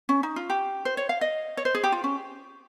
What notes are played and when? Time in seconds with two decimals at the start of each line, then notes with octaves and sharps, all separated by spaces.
0.09 C#4
0.23 D#4
0.36 F4
0.50 G4
0.85 C5
0.97 C#5
1.09 F5
1.21 D#5
1.57 C#5
1.65 C5
1.75 G#4
1.84 G4
1.92 F4
2.04 C#4